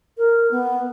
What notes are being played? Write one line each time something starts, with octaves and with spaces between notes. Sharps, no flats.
A#4
B3